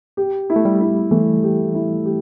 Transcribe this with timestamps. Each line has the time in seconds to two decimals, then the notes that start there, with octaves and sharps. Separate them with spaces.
0.17 G4
0.50 E4
0.56 A3
0.65 G3
0.81 E4
1.11 E3 A3
1.43 G4
1.74 E4
2.05 G4